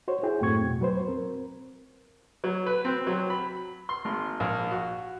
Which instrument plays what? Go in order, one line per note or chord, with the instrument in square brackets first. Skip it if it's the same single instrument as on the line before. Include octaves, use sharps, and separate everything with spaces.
[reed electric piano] F#4 C5 C#5
E4 F#4 G#4 G5
F#2 A2 A3 C4 C#6 G#6
F2 B2
F#3 B4 C5
C4 A#4
[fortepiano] F#3
B4
C4
F#3
B5
C6
G#1
A#1
F#4